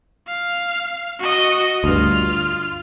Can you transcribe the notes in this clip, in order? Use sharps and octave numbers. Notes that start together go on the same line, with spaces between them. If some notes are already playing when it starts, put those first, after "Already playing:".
F5
F#4 D#5
D2 G2 F4 F6